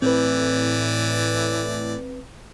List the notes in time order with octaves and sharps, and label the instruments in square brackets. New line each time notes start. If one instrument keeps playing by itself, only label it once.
[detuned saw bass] A2 [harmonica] E3 D5 [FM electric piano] C4 B4